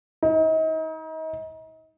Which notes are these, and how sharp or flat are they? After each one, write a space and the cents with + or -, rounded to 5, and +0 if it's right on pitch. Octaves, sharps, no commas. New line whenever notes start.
D#4 +35